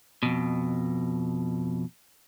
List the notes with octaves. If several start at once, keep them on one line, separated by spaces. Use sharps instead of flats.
F2 B2